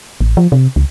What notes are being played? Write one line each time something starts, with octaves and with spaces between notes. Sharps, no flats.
A1
F3
C3
C#2